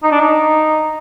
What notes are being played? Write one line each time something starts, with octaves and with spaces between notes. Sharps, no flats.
D#4
D4
D#4